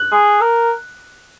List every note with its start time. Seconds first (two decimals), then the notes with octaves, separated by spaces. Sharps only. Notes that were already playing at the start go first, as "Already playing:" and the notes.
Already playing: F#6
0.12 G#4
0.41 A#4